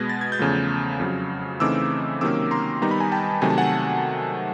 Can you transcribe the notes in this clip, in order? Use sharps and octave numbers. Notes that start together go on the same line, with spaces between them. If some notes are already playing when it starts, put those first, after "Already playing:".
Already playing: B2 G#3 B3 G#6 A#6
A6
G#6
G6 A6
E2 C#3 F3 A3
F2 C#3 F#3
C#3 E3 A3 C4 D#4 D6 E6
C3 D#3 F#3 A#3 C#4 D6 E6
A#5 C6
D#3 G3 B3 D#4 A#5
B5
G#5 A#5
G5 A5
C3 D#3 F#3 A3 G#5
A5
F#5 G#5